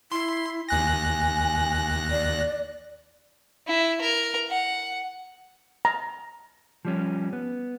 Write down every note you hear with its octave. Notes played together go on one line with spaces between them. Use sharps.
E4 C6
D#2 G#5 F#6 A#6
D5
E4
A#4
F#5
A#5
F3 G3 C#4
B3